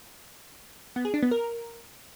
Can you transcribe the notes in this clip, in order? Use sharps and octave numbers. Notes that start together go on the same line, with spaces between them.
B3
G#4
D4
B3
A#4